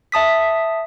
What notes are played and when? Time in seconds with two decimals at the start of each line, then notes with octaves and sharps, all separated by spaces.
0.12 E5 A5 D#6 B6